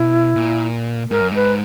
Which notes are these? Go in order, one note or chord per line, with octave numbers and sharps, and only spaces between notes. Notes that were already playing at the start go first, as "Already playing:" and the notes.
Already playing: B2 E4
A#2
G#2 A#4
F#2
G#2 B4